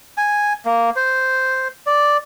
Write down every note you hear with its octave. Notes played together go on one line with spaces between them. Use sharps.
G#5
A#3
C5
D5